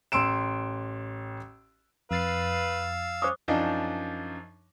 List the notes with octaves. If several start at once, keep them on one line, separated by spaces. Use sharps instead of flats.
A1 C6 E6 D7 E7
F2 B4 F5 E6 A6 C7
C#4 C5 D6 D#6
F#2 F3 D4 D#4